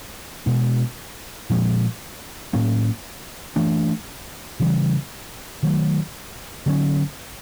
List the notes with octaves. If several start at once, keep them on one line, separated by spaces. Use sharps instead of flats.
B2 G#3 B3 D4
A#2 F3 G#3
A2 F#3 A#3 C#4
E3 A3 D4
C#3 E3 G3
D#3 F#3 A3
D3 F#3 A3 C#4